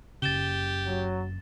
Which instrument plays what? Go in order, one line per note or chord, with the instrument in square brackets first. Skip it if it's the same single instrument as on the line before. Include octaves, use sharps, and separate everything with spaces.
[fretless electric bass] F#1 C#3 [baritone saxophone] G4 [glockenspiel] A6 E7 G7
[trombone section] F#3